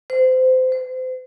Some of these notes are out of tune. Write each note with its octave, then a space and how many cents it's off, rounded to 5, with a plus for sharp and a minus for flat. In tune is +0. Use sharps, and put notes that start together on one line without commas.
C5 -25
C5 -35